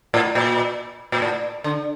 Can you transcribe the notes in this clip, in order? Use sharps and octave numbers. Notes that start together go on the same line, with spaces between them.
A2
A#2
A#2
A2
D3